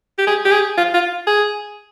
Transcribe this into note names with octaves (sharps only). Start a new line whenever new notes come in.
G4
G#4
G4
G#4
F4
F4
G#4